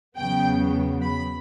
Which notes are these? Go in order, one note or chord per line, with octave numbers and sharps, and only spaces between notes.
E2 C#3 F#3 B3 G5
B5